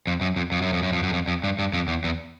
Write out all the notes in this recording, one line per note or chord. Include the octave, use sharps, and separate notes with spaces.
F2
F#2
F2
F2
F#2
F2
F#2
F2
F#2
F2
F2
G2
G2
F2
E2
E2